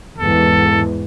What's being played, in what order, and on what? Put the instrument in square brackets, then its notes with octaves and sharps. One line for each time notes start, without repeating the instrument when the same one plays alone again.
[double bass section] E2 G#2 E3 [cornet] A4